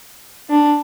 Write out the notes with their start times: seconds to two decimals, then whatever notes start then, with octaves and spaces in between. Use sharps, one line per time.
0.50 D4